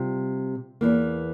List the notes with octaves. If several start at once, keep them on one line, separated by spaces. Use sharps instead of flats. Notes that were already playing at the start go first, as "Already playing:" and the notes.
Already playing: C3 G3 F4
E2 E3 A#3